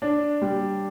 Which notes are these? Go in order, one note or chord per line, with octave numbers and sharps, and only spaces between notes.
D4
G3